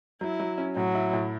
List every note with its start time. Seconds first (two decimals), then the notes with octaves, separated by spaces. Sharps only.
0.21 F#3 E4
0.40 F#3
0.58 C#4
0.76 A2 F#3
0.95 E4
1.13 A2